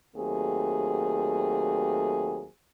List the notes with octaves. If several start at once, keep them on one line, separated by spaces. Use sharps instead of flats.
D#2 F#3 A3 C4 G#4